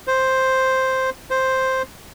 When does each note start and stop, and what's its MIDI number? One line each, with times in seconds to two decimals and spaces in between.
0.07 1.10 72
1.31 1.82 72